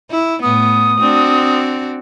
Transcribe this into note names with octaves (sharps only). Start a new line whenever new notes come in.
E4
A2 B3 D#6
C4 D4 F#4